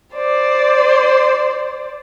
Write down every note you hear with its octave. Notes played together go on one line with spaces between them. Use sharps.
C5 D5